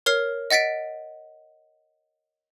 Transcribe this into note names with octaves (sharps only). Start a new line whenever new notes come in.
A#4 C#5 F6 C7
D#5 F#5 A6 B6 D7